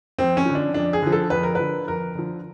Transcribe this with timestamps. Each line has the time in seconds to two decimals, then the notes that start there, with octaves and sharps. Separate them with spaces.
0.18 F2 C4
0.37 C#4
0.46 D3 F3
0.55 D4
0.74 F2 D4
0.93 G#4
1.02 D3 F3
1.12 A4
1.30 F2 B4
1.43 A#4
1.55 D3 F3 B4
1.87 F2 A#4
2.15 D3 F3